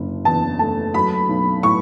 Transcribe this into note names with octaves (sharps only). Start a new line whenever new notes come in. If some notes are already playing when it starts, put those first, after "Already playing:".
Already playing: F#1 D3
E2 A5
A3 A5
F#3 B5
B1
A2 C#6